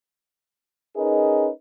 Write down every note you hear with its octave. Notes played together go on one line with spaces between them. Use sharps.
C#4 D#4 G#4 A#4 B4 D#5